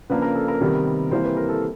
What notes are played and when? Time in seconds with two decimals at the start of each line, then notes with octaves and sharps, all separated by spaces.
0.10 C#3 F3 A#3 D4 B4
0.22 A#4
0.35 A4
0.48 A#4
0.61 C3 D#3 G3 B3
1.11 C3 E3 G3 A#3 C5
1.24 B4
1.37 A#4
1.49 A4